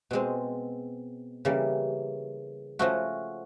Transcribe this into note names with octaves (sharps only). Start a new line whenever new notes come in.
B2 G#3 C4
C#3 E3 G3 A#3
F3 A3 C#4 F#4